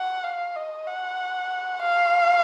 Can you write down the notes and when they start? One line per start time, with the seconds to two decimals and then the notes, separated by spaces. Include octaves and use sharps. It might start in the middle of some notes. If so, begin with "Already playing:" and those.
Already playing: F#5
0.23 F5
0.56 D#5
0.87 F#5
1.82 F5